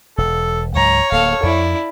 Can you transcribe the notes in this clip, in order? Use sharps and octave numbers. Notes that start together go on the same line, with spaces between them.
E1 A4
C#2 G#2 F#3 C#5 A#5
D1 A#3 A4 F5
F2 E4 D5